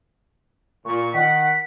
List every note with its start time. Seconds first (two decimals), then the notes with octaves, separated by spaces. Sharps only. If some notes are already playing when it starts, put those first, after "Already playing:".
0.85 A#2 C#6
1.13 D#3 F#5 B6